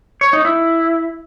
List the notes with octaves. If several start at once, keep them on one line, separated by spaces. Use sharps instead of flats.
C#5
D#4
E4